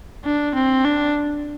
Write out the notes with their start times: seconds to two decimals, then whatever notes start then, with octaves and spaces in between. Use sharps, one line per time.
0.24 D4
0.55 C4
0.85 D4